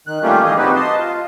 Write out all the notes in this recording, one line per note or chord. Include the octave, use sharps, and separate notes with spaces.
D#3 F#6
G3 A3 A#3 C#4 F4 G4
A#2 D#3 E3 G#4 D#5
C4 D#4 F#4 G4 B4
D#5 A5 C6
F4